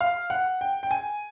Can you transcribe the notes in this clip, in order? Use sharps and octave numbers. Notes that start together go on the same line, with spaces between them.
F5
F#5
G5
G5
G#5